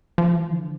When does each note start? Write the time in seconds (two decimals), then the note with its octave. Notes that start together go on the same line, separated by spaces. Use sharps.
0.18 F3
0.36 E3
0.53 D3